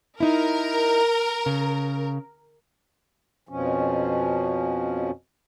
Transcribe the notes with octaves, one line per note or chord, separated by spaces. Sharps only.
D#4 E4 A#4
C#3
F2 B2 F3 C#4